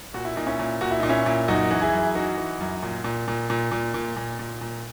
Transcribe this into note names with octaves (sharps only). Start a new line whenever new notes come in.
A#2 F#4
E4
A#2 D#4
C#4 E4
A#2
A#2 F#4
E4
A#2 D#4
C#4 E4
A#2
F#2 D#4 F#4
E3
E4 G#4
F#2
E3 D#4 F#4
E3
F#2
A#2
A#2
A#2
A#2
A#2
A#2
A#2
A#2
A#2